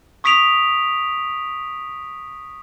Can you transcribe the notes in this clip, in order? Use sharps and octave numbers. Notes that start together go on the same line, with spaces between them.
C#6 D#6 B6 D7 F7